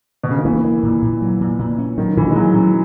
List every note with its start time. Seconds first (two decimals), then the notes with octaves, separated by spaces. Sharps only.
0.24 B2
0.30 C#3
0.39 D#3
0.45 E3 A#3
0.64 A#3
0.83 A#2
1.02 A#2
1.22 F#3
1.41 A#2
1.59 A#2
1.78 C#4
1.98 D#3 F#3
2.17 A#2 E3
2.31 G#3
2.36 F#3 A#3
2.54 F#3 C#4